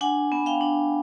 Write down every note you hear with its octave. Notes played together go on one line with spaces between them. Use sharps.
D4 F#5 G#5
B3
F5 G5
D4